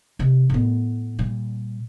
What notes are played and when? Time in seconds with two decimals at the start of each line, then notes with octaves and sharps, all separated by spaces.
0.19 C3 D#3
0.50 A2 B3
1.19 A#2 G3